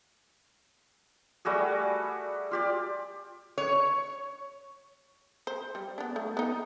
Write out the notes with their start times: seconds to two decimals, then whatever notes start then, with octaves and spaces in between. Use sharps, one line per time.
1.45 G3 A3 F#4 G#4
2.51 F4 G4 D5
3.58 C#5
5.47 C5
5.75 G3
5.98 B3 D4
6.16 A3
6.37 B3 D#4